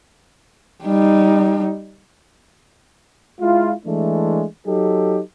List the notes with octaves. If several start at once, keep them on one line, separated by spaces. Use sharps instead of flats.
G3 D#4
G#3 E4 F4
E3 G#3 A3 D4
F#3 D#4 G4 A4